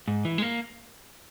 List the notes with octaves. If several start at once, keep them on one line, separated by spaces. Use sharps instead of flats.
G#2
E3
G#3
A#3